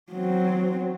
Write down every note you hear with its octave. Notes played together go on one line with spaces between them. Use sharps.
F#3 C4